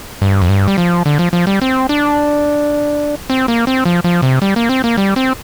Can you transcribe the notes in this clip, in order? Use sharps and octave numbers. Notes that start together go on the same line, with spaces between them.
G2
F2
G2
G3
F3
D3
F3
F3
G3
C4
D4
C4
A#3
C4
F3
F3
C3
G3
A#3
C4
A#3
G3
C4